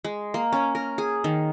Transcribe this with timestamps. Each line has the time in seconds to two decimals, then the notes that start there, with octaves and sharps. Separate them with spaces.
0.04 G#3
0.34 A#3
0.52 C#4
0.75 A#4
0.98 G#4
1.24 D#3